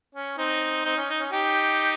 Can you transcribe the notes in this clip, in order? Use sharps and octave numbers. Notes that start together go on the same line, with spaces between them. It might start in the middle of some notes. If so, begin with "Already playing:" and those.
C#4
C4 D#4
C4 D#4
C#4
D#4
C#4
D#4 G4